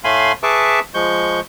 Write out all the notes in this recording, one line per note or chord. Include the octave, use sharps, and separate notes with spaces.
A2 A3 F5 G#5 B5 C6
G#4 B4 E5 A5 C#6 D6
F3 G#3 C#6 G6